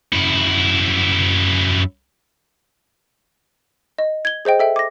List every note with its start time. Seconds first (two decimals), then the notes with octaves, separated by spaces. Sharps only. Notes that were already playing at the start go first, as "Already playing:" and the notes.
0.13 F#2 E4
3.98 D#5
4.25 G#6 G7
4.45 G#4 C5 D#5 G5
4.59 A4 E5 G5
4.76 D6 A#6